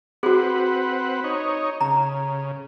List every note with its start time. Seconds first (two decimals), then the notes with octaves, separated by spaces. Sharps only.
0.23 C4 F#4 G#4 B4 F#5
1.24 D#4 C#5
1.81 C#3 A#5